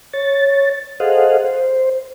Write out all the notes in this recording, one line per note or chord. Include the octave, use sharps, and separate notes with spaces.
C#5 A6
G#4 A4 C5 D#5 F5 F#5
C5